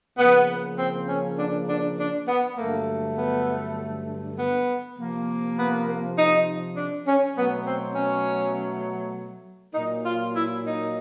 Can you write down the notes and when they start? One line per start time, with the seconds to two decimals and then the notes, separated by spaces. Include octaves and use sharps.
0.18 C#3 F3 A#3 B3
0.78 C4
1.08 C#4
1.38 D4
1.68 D4
1.98 D4
2.28 B3
2.57 G2 D3 F#3 A3 A#3
3.17 B3
4.38 B3
4.96 C3 F3 A#3
5.57 B3
5.87 A#3
6.17 D#4
6.76 D4
7.07 C#4
7.36 B2 F#3 A3 B3
7.66 C4
7.95 C#4
9.75 A#2 F#3 A#3 D#4
10.05 F4
10.35 E4
10.64 D#4